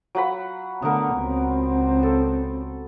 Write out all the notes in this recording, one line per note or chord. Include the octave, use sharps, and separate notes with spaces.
F#3 F#5 B5
D3 A3 B3 A#4
C#2 C4
A4